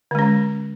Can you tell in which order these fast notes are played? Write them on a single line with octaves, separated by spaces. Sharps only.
D3 G#3 C#4